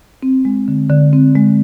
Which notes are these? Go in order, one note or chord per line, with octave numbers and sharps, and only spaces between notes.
C4
G#3
D3
D3
C4
G#3